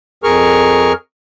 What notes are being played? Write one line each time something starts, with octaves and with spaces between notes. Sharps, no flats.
F2 G#4 A#4 C#6 F6